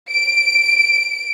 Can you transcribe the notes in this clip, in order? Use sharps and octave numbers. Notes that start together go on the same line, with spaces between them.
D7